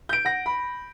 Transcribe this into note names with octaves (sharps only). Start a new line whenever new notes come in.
G6 D7
F#5 A#6
B5